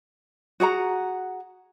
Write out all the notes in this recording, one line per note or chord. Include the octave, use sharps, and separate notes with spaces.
F#4 G#4 F#5 A#5